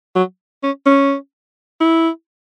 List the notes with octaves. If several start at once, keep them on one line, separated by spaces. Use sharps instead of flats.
F#3
C#4
C#4
E4